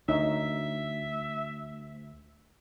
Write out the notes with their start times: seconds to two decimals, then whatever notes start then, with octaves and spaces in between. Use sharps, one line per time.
0.09 D2 D#4 C#5 E5